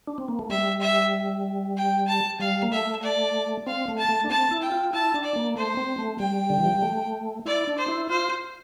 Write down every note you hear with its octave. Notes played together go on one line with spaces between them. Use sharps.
D4
C4
A#3
A3
G3 E5
E5
G5
A5
G3 F5
A#3
A3 E5
D5
C4 F5
A3
A5
A3
D4
C4 A5
E4
G5
F4
E4 A5
D4
D5
A#3
A3 C5
C4
A3
G3 G5
D3
E3
F3
G3
A3
E4 D5
D4
C5
E4
F4 C5